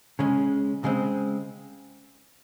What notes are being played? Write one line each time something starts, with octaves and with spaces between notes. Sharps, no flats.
C#3 G#3 C#4
C#3 G#3 C4